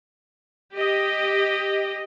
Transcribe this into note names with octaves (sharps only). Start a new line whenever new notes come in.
G4 D#5